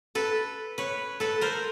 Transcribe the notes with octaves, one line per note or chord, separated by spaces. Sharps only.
A4 B4
B4 C#5
A4 B4
A#4 C5